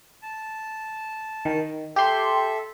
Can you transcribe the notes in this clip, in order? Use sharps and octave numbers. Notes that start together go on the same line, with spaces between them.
A5
D#3
G4 A4 E5 C6